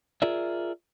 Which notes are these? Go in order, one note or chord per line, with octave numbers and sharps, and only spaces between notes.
F4 G#4 A#4 D5 E5